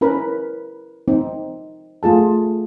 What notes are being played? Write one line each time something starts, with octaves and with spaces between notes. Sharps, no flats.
C#4 E4 A#4 B4 B5
C4 D#4
A3 F4 G#4 A5